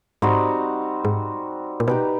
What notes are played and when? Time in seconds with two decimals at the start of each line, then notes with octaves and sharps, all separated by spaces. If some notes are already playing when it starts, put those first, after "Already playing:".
0.22 G#2 G3 C4 D#4 F#4
1.05 G#2
1.80 A#2
1.88 B2 D#4 G4 B4